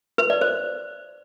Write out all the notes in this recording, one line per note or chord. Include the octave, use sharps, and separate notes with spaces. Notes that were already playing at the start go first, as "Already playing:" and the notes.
B4
D5
C5